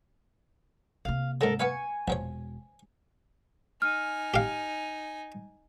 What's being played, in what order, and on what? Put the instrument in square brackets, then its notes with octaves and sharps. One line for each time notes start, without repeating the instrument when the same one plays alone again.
[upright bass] C3 A#3 [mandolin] F5
[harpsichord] G#2 C#3 [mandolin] A4 A#4
[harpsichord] B3 B4 F5 [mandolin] G#5 C#6
[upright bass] E1 [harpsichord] A#1 F3 C#5
[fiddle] D#4 G#5 [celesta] F6
[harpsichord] G4 F5